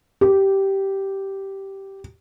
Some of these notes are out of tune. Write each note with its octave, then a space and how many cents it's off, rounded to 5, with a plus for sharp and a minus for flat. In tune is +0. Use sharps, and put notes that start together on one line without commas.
G4 -10